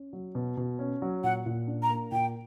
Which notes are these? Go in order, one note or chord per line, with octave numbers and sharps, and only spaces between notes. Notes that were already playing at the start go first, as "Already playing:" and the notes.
Already playing: C#4
F#3
B2
B2
C#4
F#3
A#2 F#5
A#2
D4
A#5
A#3
A#2 G5